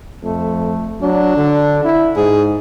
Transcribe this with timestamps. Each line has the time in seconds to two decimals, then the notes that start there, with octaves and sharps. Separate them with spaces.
0.22 F2 A3
1.02 F#3 D4
1.37 D3
1.85 E4
2.16 G#2 G#4